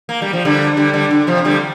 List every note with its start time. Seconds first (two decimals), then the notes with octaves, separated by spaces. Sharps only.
0.09 A#3
0.22 G3
0.33 F3
0.45 D3 G3
0.77 D3 G3
0.93 D3 G3
1.11 D3
1.27 C3 F3
1.45 D3 G3